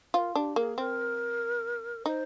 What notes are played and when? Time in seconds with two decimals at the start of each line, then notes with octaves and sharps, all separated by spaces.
0.14 F4 C5
0.18 A#4
0.35 D4 G4
0.56 A#3 G#4
0.78 C4 A#4
2.06 D#4 C5